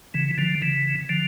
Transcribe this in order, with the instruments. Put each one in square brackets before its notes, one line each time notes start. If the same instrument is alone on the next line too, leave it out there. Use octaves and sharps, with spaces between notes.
[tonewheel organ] C#3 E3
D3 F3
C#3 E3
D3 F3